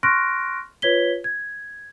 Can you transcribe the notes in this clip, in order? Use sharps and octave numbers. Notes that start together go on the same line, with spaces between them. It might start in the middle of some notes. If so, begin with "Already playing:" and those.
C6 C#6 F6 F#6 A#6 D7
F4 B4 C#5 G#6 B6 G7
G#6